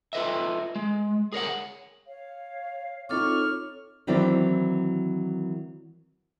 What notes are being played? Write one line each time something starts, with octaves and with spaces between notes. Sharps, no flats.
F4 A4 B4 D#5 E5
G#3
G#4 A#4 C#5 F#5
C#5 F5
C4 D#4 F4 A4 C#5 C#6 D6 F6
D#3 E3 F#3 C4 E4 D5